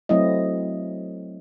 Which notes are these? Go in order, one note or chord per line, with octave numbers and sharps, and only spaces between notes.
F#3 A3 C4 E4 D#5